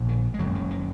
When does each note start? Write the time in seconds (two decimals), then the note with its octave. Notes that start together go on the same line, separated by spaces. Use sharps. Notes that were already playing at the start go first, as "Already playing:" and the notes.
Already playing: A#1 A#2
0.09 D#3
0.34 G#3
0.39 F#1 F#2 C#3 F#3
0.55 D#3
0.70 D#3